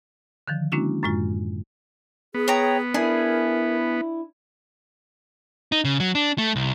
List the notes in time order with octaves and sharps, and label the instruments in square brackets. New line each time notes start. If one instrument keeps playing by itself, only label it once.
[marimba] D3 D#3 F3
G#3 A#3 C#4 D4 E4 F#4
F#2 A2 G#3 F4
[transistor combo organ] B3 [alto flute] G#4
[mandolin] C#5 G5 A#5
[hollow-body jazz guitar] D4 E4 [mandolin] G#4 [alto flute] A#4
[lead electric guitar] D#4
C#3
F#3
D4
A3
C2